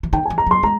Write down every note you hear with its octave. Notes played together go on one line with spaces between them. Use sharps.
E3
D#3 G5
G#5
E3
A#5
F#3
C6
G#3 A#5